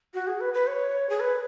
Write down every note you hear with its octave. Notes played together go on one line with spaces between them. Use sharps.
F#4
G#4
B4
B4
C#5
G#4
B4